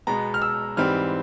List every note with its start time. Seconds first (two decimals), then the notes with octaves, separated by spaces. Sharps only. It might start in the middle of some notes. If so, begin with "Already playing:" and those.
0.07 B2 G#3 B3 A#5
0.34 F6
0.42 E6
0.77 G#2 E3 G3 C4 F6